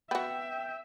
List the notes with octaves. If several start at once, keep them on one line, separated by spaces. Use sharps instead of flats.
B3 F#4 E5 G5